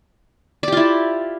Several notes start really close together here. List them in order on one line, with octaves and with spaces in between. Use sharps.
D5 G4 F4 E4